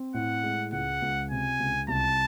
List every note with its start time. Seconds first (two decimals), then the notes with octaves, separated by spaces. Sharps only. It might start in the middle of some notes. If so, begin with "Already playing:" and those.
Already playing: C4
0.14 A2 F#5
0.43 G#3
0.72 C#2 F#5
1.02 C#2
1.31 C3 G#5
1.60 C#2
1.88 C2 A5